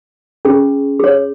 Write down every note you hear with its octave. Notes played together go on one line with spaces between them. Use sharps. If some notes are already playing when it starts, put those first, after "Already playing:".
C#4 G#4
G#4 C#5